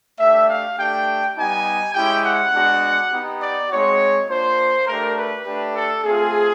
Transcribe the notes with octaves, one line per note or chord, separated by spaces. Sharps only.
A3 D4 G4 E5
F5
A3 D4 G4 G5
G3 B3 D#4 G4 G#5
G#3 C#4 E4 G4 G5
F#5
G#3 B3 D4 F#4
B3 D#4 G4
D5
G#3 C4 D#4 F#4 C#5
A#3 D4 F4 C5
A3 D4 G4 A#4
B4
A3 D4 G4
A4
A3 C4 F4 G#4